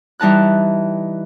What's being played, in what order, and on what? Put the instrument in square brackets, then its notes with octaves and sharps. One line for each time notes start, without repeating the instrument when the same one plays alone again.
[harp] E3 G3 D#4 A5 F#6